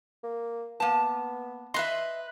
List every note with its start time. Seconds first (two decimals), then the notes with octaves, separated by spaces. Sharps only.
0.23 A#3
0.80 A#3 B3 A5
1.74 B4 D#5 E5 C6